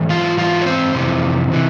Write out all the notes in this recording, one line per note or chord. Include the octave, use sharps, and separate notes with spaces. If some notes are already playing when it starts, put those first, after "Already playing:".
Already playing: G#2 E3
F4 F5
G#2 E3 F4 F5
C#5
C4 C5
F2 C3 E3
C3 E3